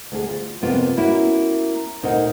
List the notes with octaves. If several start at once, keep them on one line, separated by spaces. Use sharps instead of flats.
D2 G#4
F4
F2 C3 A#3 B3 F4
A#3 C#4 E4 F#4
D2 A#2 D#4 A#4 C5 F#5